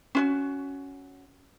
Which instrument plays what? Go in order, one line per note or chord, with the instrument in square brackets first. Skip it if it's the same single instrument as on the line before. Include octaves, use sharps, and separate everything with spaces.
[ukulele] C#4 F4 F#4